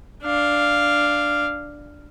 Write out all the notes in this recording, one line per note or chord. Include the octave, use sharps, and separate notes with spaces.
D4 F5